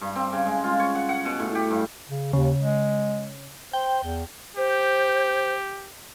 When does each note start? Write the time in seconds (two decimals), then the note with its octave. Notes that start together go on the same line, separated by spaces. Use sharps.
0.01 G2
0.15 C4
0.32 C#3
0.46 G#3
0.64 F4
0.79 C#5
0.95 F#5
1.09 F#5
1.25 B2
1.39 A2
1.55 G4
1.71 G2
2.09 C#3
2.33 D#2 C#3
2.61 G#3
3.73 C5 G5
4.03 E2
4.57 G4 C5